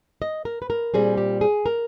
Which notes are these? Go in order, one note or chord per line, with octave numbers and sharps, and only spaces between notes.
D#5
A#4
B4
A#4
A#2 G3 C4 G#4
G4
G#4
A#4